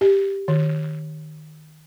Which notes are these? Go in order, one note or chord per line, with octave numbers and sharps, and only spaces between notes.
G4
D#3